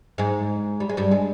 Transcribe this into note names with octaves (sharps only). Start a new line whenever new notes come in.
G#2 G#3
G3
G#3
G2 G3
G#3